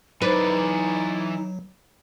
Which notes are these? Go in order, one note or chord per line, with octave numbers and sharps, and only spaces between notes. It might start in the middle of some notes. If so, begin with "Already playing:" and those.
E3 F#3 D#4 B4 D5